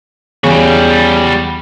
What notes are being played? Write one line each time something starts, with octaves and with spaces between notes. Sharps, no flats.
E2 C#3 G3 F#4